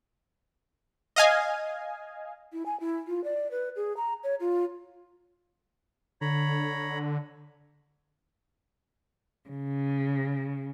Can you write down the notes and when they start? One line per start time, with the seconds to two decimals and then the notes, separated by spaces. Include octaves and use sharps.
1.16 D#5 F5 G#5
2.53 E4
2.66 G#5
2.80 E4
3.07 F4
3.24 D5
3.51 B4
3.76 G#4
3.97 A#5
4.24 C#5
4.40 F4
6.21 D3 C#5 A#5 B5
9.50 C#3